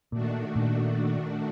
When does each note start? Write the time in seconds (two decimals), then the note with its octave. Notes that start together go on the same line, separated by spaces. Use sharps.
0.12 A#2 D#3 A3 D4 F#4
0.56 A#2